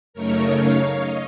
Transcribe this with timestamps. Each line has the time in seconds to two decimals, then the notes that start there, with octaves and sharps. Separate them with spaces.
0.14 F#2 C#3 A3 D#4 A#4 C#5
0.56 C#5 F5
0.97 D#5